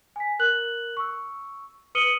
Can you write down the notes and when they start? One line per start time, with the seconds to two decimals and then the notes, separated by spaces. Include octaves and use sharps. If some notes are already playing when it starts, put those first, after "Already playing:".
0.16 G#5 B6
0.39 A#4 F#6 F#7
0.97 C#6 E6
1.95 B4 D#6 C#7 D#7 F#7 G7